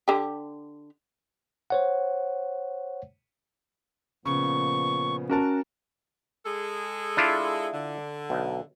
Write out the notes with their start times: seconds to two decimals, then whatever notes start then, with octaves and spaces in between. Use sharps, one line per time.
0.08 D3 G4
1.70 C5 C#5 F#5
4.26 A#2 C#3 F3 B3 C#6
5.30 C#4 F#4 A#4 A5
6.45 G#3 G#4 A4
7.17 D4 E4 F4
7.73 D3
8.30 B1